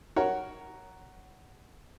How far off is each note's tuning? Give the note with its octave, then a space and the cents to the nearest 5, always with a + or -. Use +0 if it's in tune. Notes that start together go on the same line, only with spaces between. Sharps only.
F#4 +10 A#4 +0 C#5 +5